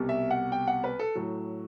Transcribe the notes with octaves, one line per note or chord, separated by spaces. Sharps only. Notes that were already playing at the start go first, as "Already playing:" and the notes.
Already playing: C2 B2 G3
E5
F#5
G5
F#5
B4
A4
A2 F#3